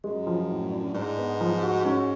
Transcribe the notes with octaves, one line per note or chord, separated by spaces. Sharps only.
F#2 G#3
F3
A2
D4
G#2 D4
B3
F3
F#4
G#2 C#4